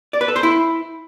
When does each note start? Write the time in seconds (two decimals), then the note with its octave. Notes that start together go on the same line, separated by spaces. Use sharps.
0.13 D5
0.21 B4
0.28 A4
0.36 C5
0.43 E4